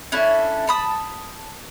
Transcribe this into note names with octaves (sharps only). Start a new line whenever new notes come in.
C#4 D4 E4 A4
A5 B5 D#6